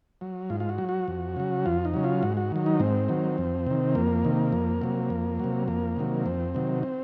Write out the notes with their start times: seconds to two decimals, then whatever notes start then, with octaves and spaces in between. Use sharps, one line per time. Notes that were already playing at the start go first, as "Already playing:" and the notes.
0.21 F#3
0.50 G#2 F4
0.60 F4
0.69 F#4
0.78 F#3
0.89 F#4
1.08 F2
1.37 C#3 F#3
1.66 F2 F4
1.85 D#4
1.94 C#3 F#3
2.04 F4
2.23 G#2 F#4
2.37 F#4
2.52 D#3 F#3
2.66 D#4
2.80 G#2 C4
3.08 D#3 F#3
3.38 F2
3.67 C3 D#3
3.95 F2 A#3
4.25 C3 D#3
4.53 F2
4.82 C3 F#3
5.10 F2
5.40 C3 F#3
5.68 F2 A#3
5.96 C3 D#3 F#3
6.26 F2 C4
6.55 C3 D#3 F#3
6.83 C4